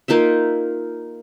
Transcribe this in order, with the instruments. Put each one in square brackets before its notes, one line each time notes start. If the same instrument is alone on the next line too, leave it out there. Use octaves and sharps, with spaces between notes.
[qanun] A#3 D#4 F4 E5